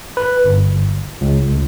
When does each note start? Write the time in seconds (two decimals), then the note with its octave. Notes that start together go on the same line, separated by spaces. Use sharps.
0.17 B4
0.44 G1
1.21 C#2